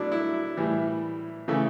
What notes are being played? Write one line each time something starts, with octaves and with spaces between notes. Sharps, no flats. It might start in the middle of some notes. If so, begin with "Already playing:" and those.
Already playing: B2 F#3 A3 D4 E4
E4
A2 E3 G3
C#3 E3 A3